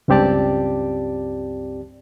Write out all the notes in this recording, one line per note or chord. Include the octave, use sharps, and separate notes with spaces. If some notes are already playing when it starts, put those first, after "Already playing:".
C#2 G2 C4 G4 D5 A5